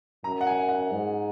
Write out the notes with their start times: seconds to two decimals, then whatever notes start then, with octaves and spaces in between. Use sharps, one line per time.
0.24 F#2 A#5
0.41 F#5
0.47 G#5
0.69 F#5
0.91 G#2